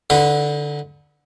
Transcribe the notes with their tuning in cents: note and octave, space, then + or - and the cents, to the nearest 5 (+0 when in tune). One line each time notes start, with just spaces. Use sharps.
D3 +0 D#4 +45 B4 +0